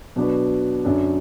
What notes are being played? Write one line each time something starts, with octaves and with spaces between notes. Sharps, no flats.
B2 F#3 D4 F#4 B4
F#2 D3 F#3 D4